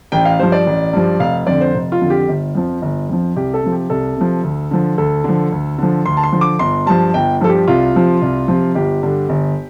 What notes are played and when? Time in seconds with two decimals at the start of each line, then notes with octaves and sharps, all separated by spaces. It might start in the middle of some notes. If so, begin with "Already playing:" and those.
0.12 A1 G5
0.25 F5
0.39 G2 F3 C5
0.52 D5
0.67 A1
0.93 G2 F3
1.20 F1 F5
1.47 F2 D3 D5
1.61 C5
1.74 F1
1.92 F4
2.01 F2 D3
2.10 G4
2.28 G1
2.55 F2 F3
2.82 G1
3.09 F2 F3
3.36 C2 G4
3.54 A4
3.63 C3 F3
3.72 G4
3.90 C2 A4
4.17 C3 F3
4.43 D2
4.71 D3 F3
4.98 D2 A4
5.24 D3 F3
5.52 D2
5.78 D3 F3
6.05 D2 C6
6.17 A5
6.23 C6
6.33 D3 F3
6.41 D6
6.59 G1 C6
6.86 G2 F3 A5
7.14 G1 G5
7.41 G2 F3 A4
7.49 G4
7.68 C2 F4
7.94 C3 F3
8.22 C2
8.48 C3 F3
8.75 G1 G4
9.03 G2 D3
9.29 G1